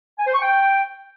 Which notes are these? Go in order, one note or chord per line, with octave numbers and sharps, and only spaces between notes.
G#5
C5
C#6
G5